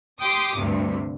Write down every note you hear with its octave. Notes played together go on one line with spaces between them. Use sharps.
G4 G5 C6 D6 D#6
D2 G2 C3